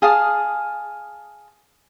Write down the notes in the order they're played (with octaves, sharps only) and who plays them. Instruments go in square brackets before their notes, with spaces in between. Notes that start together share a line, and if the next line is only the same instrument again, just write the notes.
[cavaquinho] G#4 F5 A5 D#6